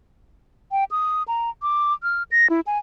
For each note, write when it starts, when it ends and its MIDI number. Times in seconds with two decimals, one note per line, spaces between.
0.72 0.84 79
0.91 1.23 87
1.28 1.50 82
1.62 1.93 86
2.03 2.23 89
2.31 2.47 94
2.50 2.60 64
2.67 2.78 80